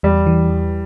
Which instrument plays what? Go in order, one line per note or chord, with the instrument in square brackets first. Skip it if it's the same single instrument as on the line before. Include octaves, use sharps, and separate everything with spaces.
[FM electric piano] E2 [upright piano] G3
[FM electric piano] E3
E2